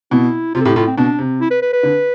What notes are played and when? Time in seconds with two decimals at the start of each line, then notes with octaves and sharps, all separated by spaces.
0.11 B2 E4
0.55 C3 F4
0.61 A4
0.65 A2 G4
0.76 A2 F4
0.87 C4
0.97 B2 D4
1.18 C3
1.41 E4
1.51 B4
1.62 B4
1.73 B4
1.83 D3